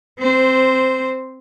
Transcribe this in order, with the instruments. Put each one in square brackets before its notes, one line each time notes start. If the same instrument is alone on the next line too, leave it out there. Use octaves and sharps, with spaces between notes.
[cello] C4 C5